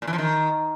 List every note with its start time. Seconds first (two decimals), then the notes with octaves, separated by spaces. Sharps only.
0.02 A#2
0.07 E3
0.13 F3
0.18 D#3